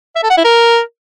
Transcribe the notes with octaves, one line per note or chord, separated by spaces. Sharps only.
E5
A4
F#5
E4
A#4